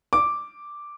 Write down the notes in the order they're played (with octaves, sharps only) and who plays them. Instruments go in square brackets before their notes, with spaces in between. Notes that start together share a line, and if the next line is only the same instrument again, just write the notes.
[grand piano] D6